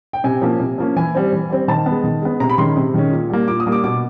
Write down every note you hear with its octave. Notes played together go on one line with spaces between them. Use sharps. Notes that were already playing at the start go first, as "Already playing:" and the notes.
G5
C3 G#5
F3 A#3 C#4
C3
F3 A#3 C#4
E3 G#5
G3 C4
E3
G3 C4
D#3 A5
G#3 B3
D#3
G#3 B3
C3 A#5
B5
D#3 G#3 C#4 C6
C3
D#3 G#3 C#4
A#2
G3 A#3
A#2 D6
D#6
G3 A#3
D6
B2 D6